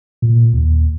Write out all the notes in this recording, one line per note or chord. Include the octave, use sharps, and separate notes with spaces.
A#2
D#2